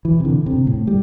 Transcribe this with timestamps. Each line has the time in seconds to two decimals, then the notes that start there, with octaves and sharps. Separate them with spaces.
0.05 E3
0.20 C3
0.25 D3
0.46 C3
0.67 A2
0.87 G3